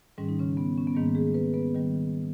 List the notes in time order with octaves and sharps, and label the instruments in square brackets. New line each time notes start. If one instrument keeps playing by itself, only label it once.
[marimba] G#2 D#3 G3 C#4
D#4
C#3 C#4
B3
C#4
B3
G#2 D#3 G3 A#3
G#3 G#4
B3 B4
B3 B4
D#3 G3